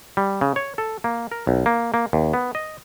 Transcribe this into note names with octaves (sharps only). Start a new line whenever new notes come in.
G3
C#3
C#5
A4
A#3
A#4
B1
A#3
A#3
D#2
B3
D#5